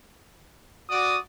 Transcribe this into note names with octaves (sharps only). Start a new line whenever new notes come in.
F#4 D5 D#6